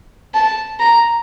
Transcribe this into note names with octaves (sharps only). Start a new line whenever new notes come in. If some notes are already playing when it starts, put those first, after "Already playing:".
A5
A#5